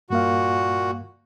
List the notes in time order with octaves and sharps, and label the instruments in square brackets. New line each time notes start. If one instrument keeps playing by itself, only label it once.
[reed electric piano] G2 A#3 F5 [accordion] A#2 F#4